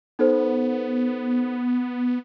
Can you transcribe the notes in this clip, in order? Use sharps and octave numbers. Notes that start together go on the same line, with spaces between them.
B3 D#4 A4 C5